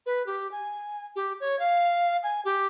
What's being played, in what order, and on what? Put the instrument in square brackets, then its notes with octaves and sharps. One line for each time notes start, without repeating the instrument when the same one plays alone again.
[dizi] B4
G4
G#5
G4
C#5
F5
G#5
G4